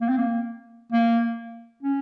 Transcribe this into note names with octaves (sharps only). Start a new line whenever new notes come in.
A#3
C4
A#3
A#3
C#4